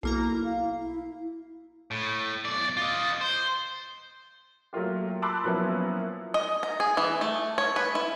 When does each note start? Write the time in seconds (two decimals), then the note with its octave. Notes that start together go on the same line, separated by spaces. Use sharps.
0.03 B1 A#3 E4 A#5
0.45 F5
0.80 E4
1.91 A2
2.45 B1 D5
2.77 F4 D#5
3.21 C5
4.73 F#3 A3 A#3 F4 G4
5.22 A5 B5 C6 D6 E6 F#6
5.44 F3 F#3 A#3 B3 C#4 E4
6.34 D#5
6.63 A#5
6.80 G#4
6.97 E3
7.21 A3
7.58 C#5
7.76 B4
7.95 E4